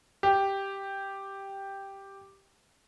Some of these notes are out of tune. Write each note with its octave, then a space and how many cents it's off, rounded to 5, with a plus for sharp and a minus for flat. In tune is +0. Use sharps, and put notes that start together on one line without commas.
G4 +0